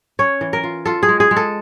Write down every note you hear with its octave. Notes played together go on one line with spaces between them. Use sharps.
C#4 C#5
E3
A#4
F4
F4 A4
G#4
G#3
G#4
G#3
A4